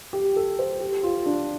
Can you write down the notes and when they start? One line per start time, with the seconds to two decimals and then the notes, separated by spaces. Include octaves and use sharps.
0.13 G4
0.36 A4
0.59 C5
0.80 G4
1.03 F4
1.26 D4